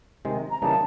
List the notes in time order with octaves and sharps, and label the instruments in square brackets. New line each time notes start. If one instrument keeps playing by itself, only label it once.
[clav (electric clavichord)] C3 D#3 G#3
[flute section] A#5
[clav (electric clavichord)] C#3 E3 G3 A#3 D#4 [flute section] A5